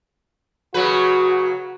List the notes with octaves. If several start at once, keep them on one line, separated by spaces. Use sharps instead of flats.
C#3 F#3 F#4 B4